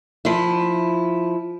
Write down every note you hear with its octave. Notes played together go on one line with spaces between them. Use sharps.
F3 E4